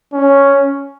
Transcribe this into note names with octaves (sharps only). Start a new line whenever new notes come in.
C#4